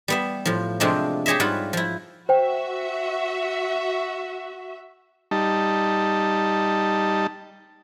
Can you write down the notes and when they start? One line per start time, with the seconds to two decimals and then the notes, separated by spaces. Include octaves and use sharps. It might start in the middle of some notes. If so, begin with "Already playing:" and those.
0.08 G3 B3 E5
0.45 A2 F3
0.80 C3 F3 G#3 A3 C4 D4
1.26 G4 G#4 C#5 D#5 E5
1.40 G#2 G3 F4 B4 F#5
1.73 F3 E4
2.29 F#4 C5 E5 G5
5.31 G3 D#4 A5